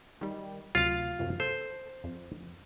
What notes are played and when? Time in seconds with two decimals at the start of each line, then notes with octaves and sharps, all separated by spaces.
0.21 D#3 G3
0.75 D2 C3 F#3 F4 F5
1.19 F#2 C3 F3
1.40 A4 C5
2.04 F2